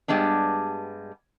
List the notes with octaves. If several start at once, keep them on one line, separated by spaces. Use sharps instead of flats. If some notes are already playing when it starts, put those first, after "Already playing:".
G2 G3 G#3 B3 D4